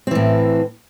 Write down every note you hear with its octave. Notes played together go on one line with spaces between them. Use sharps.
A2 E3 C4